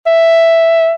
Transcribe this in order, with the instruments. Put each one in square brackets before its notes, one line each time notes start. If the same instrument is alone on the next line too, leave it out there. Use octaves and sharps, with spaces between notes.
[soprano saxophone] E5